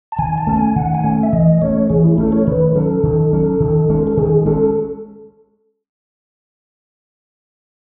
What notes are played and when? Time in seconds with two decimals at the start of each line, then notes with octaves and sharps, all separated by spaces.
0.12 A5
0.19 D#3 G#5
0.38 A5
0.47 A3 C#4
0.57 G#5
0.76 D#3 F#5
0.95 G#5
1.04 A3 C#4
1.23 E5
1.33 E3 D#5
1.62 A3 C#4 C#5
1.89 E3 G#4
2.04 E4
2.18 A3 C#4 A4
2.32 C#5
2.47 D#3 B4
2.75 F#3 C#4 A4
3.03 D#3
3.33 F#3 C#4
3.60 D#3
3.89 G#3 C#4
4.07 A4
4.17 D#3 G#4
4.45 G#3 C#4 A4